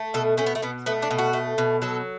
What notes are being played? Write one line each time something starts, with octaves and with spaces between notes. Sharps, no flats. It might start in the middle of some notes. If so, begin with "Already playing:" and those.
Already playing: A3
B2 A4
A3 C#4
B3
A3
B2 B3
A3 B3
D4
B2
F#4
A3
B2
F#3 A4